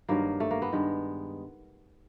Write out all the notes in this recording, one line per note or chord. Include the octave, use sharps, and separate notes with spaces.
G2 D#3 F#3 A#3
A3
A#3
B3
G2 D#3 G#3